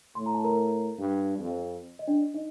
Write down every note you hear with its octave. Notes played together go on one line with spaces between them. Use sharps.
A2 C6
A#5
A5
A#4 A#5
G2
F2
D#5
D4 D5
D#4 D#5